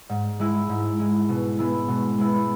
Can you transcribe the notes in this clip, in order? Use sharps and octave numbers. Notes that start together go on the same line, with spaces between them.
G#2
G#3 E4
G#2
G#3 E4
B2
G#3 B3 E4
B2
G#3 B3 E4